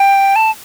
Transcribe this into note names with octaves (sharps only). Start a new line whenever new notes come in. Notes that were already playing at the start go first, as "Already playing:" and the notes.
Already playing: G5
A5